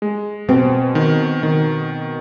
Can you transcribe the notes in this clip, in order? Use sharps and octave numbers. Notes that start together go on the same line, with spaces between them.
G#3
B2 C4
D#3
D#3